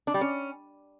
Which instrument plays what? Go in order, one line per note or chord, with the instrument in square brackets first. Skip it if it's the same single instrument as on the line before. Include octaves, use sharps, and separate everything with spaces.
[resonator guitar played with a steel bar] D4
G3
C#4